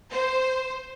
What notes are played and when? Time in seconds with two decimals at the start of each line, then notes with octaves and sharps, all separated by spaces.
0.11 C5